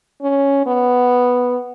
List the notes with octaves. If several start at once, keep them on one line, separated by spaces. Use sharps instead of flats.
C#4
B3